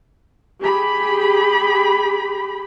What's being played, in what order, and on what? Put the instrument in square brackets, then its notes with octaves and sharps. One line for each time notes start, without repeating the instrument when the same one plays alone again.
[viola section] G4 G#4 B5